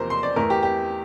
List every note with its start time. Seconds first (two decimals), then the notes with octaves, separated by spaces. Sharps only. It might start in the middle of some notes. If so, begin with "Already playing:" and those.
Already playing: E2 C3 F3 A#3 A#4 C5
0.10 C6
0.23 D5
0.36 E2 E3 A3 A#4
0.50 G4
0.63 G4